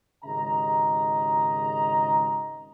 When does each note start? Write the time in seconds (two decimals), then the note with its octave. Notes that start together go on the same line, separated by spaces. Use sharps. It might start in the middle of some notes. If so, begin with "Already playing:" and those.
0.24 G#1 C#3 G4 D#5 A#5